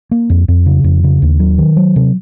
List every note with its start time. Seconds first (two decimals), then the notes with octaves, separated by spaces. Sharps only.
0.11 A#3
0.30 F2
0.48 F2
0.66 C#3
0.84 F2
1.04 C#3
1.22 D#2
1.39 F#3
1.58 D#3
1.76 F#3
1.96 C3